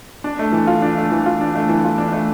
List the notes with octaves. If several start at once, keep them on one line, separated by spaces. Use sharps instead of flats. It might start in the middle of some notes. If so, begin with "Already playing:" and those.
D4
A3
E3
F4
D4
A3
E3
F4
D4
A3
E3
F4
D4
A3